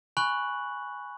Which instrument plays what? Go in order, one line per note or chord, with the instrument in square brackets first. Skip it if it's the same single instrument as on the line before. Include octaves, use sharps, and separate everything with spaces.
[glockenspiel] G#5 B5 C#6 F#6 F#7